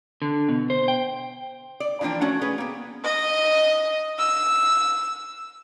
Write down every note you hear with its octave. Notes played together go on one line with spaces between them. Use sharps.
D3
B2
C5
G5
D5
E3 F3 A#3 D4 G5
A3 C#4 F#4
C#4 G#4 B4
A#3 B3
D#5
E6